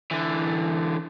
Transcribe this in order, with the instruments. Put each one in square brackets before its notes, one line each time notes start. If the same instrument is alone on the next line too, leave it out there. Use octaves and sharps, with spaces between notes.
[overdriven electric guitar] D3 E3